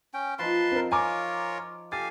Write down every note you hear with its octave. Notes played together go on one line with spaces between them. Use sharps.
C#4 G5
F3 D#4 B4 A5 C6
C4 A#4
F4 A#4 C#5 G#5 A#5 D6
G4 A4 F5 G#5 A6